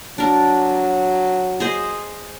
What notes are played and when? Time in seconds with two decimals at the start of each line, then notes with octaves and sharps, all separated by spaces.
0.18 F#3 D4 A#4
1.60 G#4 C5 D#5